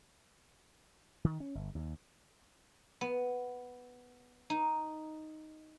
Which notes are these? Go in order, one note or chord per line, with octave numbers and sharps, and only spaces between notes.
D#3
C#4
G1
D#2
B3
D#4